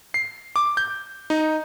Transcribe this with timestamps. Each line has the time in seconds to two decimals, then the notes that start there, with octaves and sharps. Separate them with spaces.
0.14 C7
0.56 D6
0.77 G6
1.30 D#4